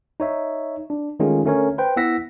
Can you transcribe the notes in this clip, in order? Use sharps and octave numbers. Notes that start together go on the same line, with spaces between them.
D#4 C#5 E5
D4
D#3 G#3 A3 C#4 F4 G#4
D3 A3 C#4 A#4 C#5
B4 C5 G5
B3 E4 F#5 E6 A#6 B6